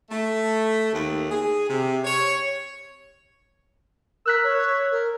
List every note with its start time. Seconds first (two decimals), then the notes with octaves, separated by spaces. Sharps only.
0.10 A3
0.92 D#2
1.30 G#4
1.68 C3
2.04 C#5
4.26 A#4 E6 F#6 B6
4.43 C#5
4.91 A#4